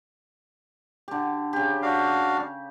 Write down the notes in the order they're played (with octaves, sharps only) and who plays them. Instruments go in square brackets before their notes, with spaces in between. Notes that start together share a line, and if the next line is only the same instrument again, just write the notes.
[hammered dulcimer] D3 G4
C#3 G4
[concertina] D4 F#4 F5